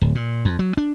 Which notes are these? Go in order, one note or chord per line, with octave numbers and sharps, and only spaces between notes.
D1
A#2
F2
F#3
D4